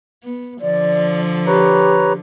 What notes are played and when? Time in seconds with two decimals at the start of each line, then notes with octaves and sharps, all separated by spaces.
0.24 B3
0.61 D3 F3 D5
1.47 G4 B4 C#5 A#5